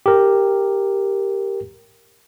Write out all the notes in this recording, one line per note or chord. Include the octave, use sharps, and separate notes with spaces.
G4 A#4